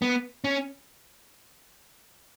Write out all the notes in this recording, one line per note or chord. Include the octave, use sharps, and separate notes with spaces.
B3
C#4